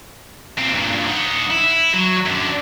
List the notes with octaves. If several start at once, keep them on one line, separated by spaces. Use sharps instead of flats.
A#2 C4
G2 A#2
D#4 F#5
E4
F#3
F#2 D3